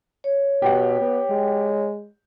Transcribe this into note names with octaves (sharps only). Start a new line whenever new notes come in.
C#5
B2 G4 F#5
B3
G#3